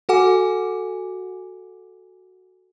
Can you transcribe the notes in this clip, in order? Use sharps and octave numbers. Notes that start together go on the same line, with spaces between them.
F#4 A4 F#5 G#5 D6